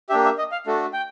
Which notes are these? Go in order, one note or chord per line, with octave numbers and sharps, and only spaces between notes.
A#3 D4 G4 E5
E5
D#5
F5
A3 D4 F#4 A4
G5